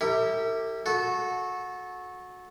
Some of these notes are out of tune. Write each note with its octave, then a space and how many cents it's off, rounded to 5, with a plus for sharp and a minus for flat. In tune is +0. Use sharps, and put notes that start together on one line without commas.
E4 -20 G4 +0 A#4 -45
F#4 -20 A4 -25